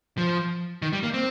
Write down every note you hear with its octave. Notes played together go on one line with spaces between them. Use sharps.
F3
D#3
G3
A#3
C4